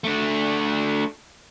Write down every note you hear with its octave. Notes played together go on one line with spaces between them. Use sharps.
A3 D4